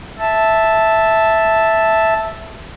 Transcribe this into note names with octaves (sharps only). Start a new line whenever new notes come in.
E5 A5